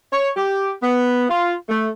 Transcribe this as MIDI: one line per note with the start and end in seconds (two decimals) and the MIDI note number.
0.13 0.30 73
0.37 0.72 67
0.83 1.25 59
1.29 1.55 65
1.69 1.88 57